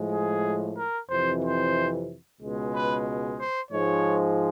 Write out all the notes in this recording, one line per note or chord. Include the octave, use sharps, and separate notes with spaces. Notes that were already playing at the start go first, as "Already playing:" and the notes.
Already playing: A2 F3 G#3
G#4
A#4
F2 C3 E3 C5
C5
C#2 B2 G#3
B4
C5
G#2 F3 G#3 C#5